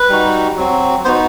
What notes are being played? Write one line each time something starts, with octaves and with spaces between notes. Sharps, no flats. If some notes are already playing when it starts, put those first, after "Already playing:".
Already playing: B4
G3 D#4 F#4
F#3 C4 F#4
B3 D#4 F#4 C5